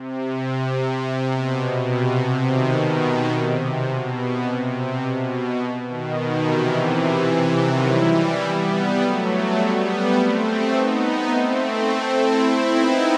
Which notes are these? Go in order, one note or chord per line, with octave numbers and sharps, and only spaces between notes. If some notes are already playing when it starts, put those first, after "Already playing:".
Already playing: C3
C3
B2
C3
B2 D#3
B2
C3
B2
C3
B2
B2 D#3
C3 E3
D#3 F#3
E3 G3
G3 B3
F#3 A3
G3 B3
A3 C4
B3 D#4
A3 C4
C4 E4
B3 D#4